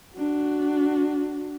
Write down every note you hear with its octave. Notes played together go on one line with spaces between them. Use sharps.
D4 F#4